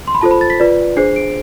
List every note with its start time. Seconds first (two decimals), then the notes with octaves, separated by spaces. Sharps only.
0.08 C6
0.15 B5
0.21 F4 A4 C5 A5
0.31 B5
0.41 A6
0.50 B6
0.60 F4 B4 D5
0.97 D4 G#4 C5 C7
1.16 D7